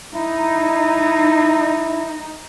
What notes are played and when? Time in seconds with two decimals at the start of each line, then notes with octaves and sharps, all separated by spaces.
0.15 D#4 E4